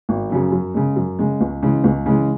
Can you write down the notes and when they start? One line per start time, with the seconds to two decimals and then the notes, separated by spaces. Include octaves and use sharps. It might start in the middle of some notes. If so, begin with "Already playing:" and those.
0.09 G#1
0.30 F#2 C#3 F#3
0.52 F#2
0.74 C#3 G#3
0.96 F#2
1.19 C#3 G#3
1.41 C#2
1.63 C#3 E3 G#3
1.84 C#2
2.06 C#3 E3 G#3